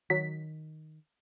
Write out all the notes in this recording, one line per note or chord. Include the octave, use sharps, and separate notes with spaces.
D#3 F#3 B6